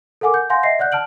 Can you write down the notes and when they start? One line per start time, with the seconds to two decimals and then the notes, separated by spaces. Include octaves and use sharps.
0.21 A4 A#4 F#5 G#5 D6
0.34 G6
0.50 F5 F#5 G#5 C6 G6 A#6
0.63 D#5 E5 A#6 C7
0.79 D5 F#5 F#6 G6
0.92 A5 F6 D7 F#7